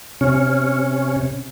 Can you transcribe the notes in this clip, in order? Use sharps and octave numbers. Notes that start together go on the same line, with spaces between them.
C3 C#4